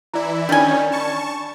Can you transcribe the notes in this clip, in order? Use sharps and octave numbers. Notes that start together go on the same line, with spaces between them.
E3 E4 D5 A#5
D#3 G3 C#4 D4 D5 G#5 B5
A5 C#6